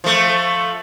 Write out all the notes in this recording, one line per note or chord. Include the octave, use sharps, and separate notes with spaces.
F3 A3